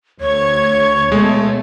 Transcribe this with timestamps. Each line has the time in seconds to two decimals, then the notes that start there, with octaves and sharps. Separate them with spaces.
0.21 D2 C#5 G#6
1.12 B2 G#3 A3